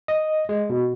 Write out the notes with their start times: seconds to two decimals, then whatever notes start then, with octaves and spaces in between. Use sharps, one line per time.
0.08 D#5
0.49 G#3
0.70 B2